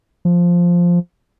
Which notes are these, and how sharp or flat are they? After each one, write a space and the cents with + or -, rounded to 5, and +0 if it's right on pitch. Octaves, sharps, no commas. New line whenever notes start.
F3 +0